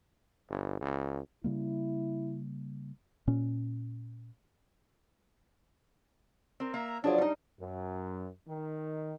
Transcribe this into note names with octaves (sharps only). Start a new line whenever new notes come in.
G1
C#2
C#3 G3 A#3 E4
A#2 C#4
C4 A#4
A#3 E5 A#5
F3 F#3 D4 G#4 D5
G3 D#4
F#2
D#3